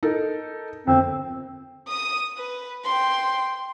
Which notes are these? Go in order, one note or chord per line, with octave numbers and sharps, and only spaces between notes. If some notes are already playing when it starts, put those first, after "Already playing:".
D#4 A4 A#4
G1 F2 C4
D#6 D#7
B4
G5 C6